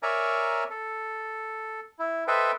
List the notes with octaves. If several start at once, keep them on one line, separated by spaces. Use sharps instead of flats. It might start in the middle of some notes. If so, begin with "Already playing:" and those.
A#4 C#5 D5 E5 G#5 A#5
A4
E4
A4 B4 C5 D#5 E5 G5